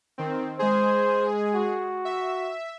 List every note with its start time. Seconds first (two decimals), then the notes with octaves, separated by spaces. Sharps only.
0.18 D#3 C4
0.59 G#3 G#4 C5
1.55 F#4
2.05 E5